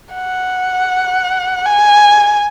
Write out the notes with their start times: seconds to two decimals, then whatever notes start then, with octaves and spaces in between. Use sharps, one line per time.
0.14 F#5
1.66 G#5